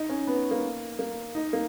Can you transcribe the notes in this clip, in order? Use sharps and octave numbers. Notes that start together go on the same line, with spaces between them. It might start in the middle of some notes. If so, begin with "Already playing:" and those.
Already playing: D#4
C#4
B3
A#3
A#3
D#4
A#3